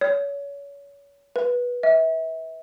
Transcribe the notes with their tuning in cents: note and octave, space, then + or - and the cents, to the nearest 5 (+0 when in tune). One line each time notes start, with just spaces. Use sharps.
C#5 +30
B4 -15
E5 -35